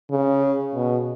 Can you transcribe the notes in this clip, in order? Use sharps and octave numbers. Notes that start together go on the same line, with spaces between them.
C#3
B2